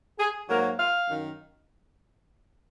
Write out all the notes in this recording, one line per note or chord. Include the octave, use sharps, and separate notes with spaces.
G#4
G#2 F#3 A#3 A#4
F5
F#2 D#3